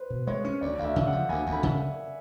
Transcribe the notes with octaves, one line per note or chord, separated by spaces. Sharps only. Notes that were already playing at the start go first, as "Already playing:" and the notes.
Already playing: B4 C5
B2
G#3 C#5
C#4
D2 D5
D2 F5
E5
C#3
F#5
F3
D2 G#5
D2
B5
C#3